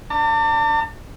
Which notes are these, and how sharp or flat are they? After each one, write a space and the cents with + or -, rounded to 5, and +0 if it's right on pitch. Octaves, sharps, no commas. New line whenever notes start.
D4 -5 A5 +40